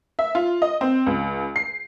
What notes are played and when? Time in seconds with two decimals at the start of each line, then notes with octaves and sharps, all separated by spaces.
0.19 E5
0.35 F4
0.62 D#5
0.81 C4
1.06 C#2
1.56 C7